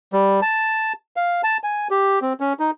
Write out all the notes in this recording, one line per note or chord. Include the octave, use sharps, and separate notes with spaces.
G3
A5
F5
A5
G#5
G4
C4
C#4
D#4